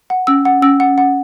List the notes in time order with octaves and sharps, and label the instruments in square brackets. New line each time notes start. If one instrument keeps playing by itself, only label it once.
[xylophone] F#5
[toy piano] C#4 [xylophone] E6
[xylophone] F#5
[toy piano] C#4 [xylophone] E6
[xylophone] F#5
F#5